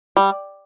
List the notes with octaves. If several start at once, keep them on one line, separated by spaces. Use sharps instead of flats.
G3